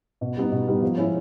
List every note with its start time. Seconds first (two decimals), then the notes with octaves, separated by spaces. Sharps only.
0.21 B2
0.37 G3 B3 D#4
0.52 B2
0.67 G3 B3 D#4
0.82 F3
0.97 G#3 C#4 E4